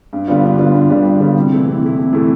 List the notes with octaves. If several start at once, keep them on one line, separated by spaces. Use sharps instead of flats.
G2
D3 G3 B3 F4
G2
D3 G3 B3 F4
G2
D3 G3 B3 F4
G2
D3 G3 B3 F4
C3
E3 A3 E4
C3
E3 A3 E4
C3
E3 A3 E4